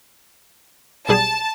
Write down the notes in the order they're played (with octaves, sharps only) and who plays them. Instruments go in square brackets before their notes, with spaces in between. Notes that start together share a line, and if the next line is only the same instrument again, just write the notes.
[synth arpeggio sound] B1 G3 G#4 [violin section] A5